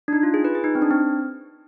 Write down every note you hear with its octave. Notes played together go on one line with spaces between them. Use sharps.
D4
D#4
F4
G#4
B4
G#4
D#4
C4
D4
C4